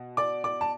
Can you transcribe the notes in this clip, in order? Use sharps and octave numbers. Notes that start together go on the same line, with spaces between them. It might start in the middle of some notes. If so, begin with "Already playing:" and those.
Already playing: B2
D5 D6
D5 D6
A5